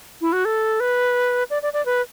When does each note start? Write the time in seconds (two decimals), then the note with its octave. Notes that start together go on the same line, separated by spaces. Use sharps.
0.21 E4
0.33 F#4
0.45 A4
0.80 B4
1.50 D5
1.62 D5
1.73 D5
1.86 B4